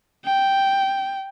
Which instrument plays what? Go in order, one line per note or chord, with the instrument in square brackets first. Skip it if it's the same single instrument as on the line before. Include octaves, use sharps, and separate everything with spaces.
[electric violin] G5